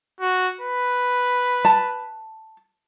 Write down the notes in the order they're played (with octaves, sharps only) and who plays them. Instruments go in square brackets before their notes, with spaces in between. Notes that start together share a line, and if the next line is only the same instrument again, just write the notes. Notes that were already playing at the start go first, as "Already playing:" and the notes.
[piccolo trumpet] F#4
B4
[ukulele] A5